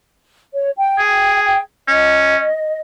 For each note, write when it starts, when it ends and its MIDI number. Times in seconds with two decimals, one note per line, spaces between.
0.53 0.70 73
0.76 1.60 79
0.98 1.57 68
1.88 2.45 61
1.88 2.78 75